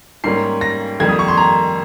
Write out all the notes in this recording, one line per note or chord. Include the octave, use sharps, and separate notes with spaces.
G#2 G3 A#3 C#4 C7
A#6
F2 D#3 G3 A#3 G#6
D#6
C#6
C6
A#5